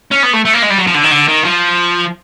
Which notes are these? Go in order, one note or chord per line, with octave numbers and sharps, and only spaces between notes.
C#4
B3
A3
A3
A#3
G#3
G3
F#3
F3
D3
D#3
D3
D#3
F3